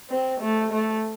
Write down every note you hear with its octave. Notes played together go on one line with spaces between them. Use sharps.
C4
A3
A3